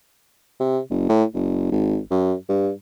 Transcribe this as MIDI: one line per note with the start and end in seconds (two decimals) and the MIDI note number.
0.60 0.80 48
0.90 1.08 30
1.09 1.24 45
1.34 1.71 30
1.72 1.98 32
2.11 2.34 42
2.49 2.71 43